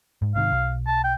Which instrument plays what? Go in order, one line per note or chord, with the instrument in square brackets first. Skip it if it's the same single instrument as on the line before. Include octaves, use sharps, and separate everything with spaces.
[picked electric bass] G#2
[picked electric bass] G#2 C3 D#3 [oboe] F5
[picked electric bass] B1
[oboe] A5
G5